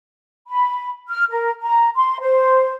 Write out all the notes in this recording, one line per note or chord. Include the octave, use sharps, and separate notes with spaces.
B5
F6
A#4
A#5
C6
C5